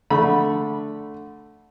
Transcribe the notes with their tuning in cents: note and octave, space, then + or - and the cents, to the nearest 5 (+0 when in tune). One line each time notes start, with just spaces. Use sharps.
D3 +0 A3 +0 B5 -15